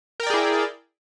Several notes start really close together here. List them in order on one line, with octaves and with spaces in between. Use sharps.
A#4 G5 D5 G#4 E4